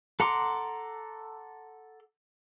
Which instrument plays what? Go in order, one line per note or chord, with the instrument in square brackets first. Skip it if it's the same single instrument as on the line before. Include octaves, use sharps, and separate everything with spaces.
[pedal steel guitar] A4 F#5 A#5 C6 D6